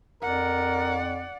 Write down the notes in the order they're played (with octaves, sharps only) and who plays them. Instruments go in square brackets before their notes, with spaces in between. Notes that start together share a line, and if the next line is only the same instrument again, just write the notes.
[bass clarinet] F2 [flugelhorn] A#4 [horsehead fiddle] D5 F#5